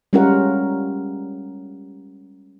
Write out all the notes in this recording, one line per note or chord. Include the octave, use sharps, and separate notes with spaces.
G3 G#3 C#4 F4 A#4 F#5